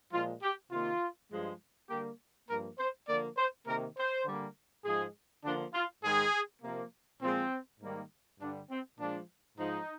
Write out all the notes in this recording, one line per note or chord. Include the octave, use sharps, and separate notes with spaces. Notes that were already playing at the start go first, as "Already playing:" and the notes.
A#2 F3 G#3 F4
G4
C3 D#3 A#3 F4
G2 F3 G#3
D3 G3 A#3 G4
G2 F3 A#3 A#4
C5
D3 F3 A#3 D5
C5
C3 D#3 A#3 A#4
C5
D3 G3 A#3
G#2 F3 G#3 G#4
D3 F3 A#3 D4
F4
G#2 D#3 G#3 G#4
C3 F3 A#3
A#2 F3 G#3 C4
G#2 D#3 G3 A#3
G2 D3 G3 D4
C4
A#2 F3 G#3 D4
G#2 F3 G#3 D#4